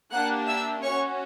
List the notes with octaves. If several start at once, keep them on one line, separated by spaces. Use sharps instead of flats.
A#3 D4 G4 F#5 F#6
E5 E6
C#4 F#4 C#5 C#6